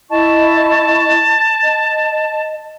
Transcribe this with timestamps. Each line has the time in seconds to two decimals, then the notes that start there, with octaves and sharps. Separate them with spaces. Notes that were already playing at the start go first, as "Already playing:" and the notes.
0.10 E4 D#5 A5 C#6
1.63 D#5